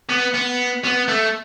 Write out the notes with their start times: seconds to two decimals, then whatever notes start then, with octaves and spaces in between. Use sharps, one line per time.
0.10 B3
0.34 B3
0.85 B3
1.08 A3